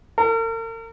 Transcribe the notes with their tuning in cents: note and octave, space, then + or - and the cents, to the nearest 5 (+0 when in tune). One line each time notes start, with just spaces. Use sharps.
A#4 -45